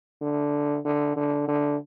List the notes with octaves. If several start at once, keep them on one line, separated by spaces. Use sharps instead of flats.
D3
D3
D3
D3